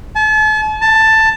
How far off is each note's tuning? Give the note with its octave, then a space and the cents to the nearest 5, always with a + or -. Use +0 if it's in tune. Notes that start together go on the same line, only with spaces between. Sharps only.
A5 -40
A5 +10